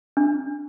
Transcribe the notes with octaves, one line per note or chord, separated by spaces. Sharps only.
D4